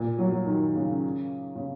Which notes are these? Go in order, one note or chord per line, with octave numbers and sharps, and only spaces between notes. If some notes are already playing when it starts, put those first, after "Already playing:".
Already playing: A#2
F#3
F#3
D#3
C#3
C#3